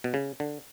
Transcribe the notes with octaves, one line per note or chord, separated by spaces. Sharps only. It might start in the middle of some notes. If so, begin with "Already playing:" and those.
B2
C#3
D3